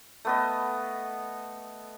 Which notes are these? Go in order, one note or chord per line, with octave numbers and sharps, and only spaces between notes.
A3 B3 D#5